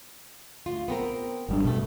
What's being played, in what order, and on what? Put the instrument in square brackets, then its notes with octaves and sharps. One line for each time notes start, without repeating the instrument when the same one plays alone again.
[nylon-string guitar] D2 F4
B3 C4 A#4
[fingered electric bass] G#1 G3 D4
[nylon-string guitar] G2 A3 [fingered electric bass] B2